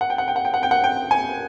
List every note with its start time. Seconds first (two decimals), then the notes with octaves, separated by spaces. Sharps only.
0.01 F#5
0.10 G5
0.18 F#5
0.28 G5
0.36 F#5
0.45 G5
0.54 F#5
0.63 G5
0.71 F#5
0.84 G5
1.11 G#5